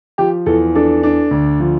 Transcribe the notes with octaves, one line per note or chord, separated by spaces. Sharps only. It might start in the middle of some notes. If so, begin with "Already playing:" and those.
F3 G4
E2 A4
D4 A4
D4
D2
F3